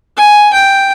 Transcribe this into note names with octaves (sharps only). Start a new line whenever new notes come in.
G#5
G5